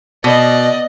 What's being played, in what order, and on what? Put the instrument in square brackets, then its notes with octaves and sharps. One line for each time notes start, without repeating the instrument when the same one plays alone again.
[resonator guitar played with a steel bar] B2 [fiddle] D5 D#5